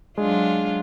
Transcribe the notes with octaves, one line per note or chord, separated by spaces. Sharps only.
F#3 G#3 D4 F4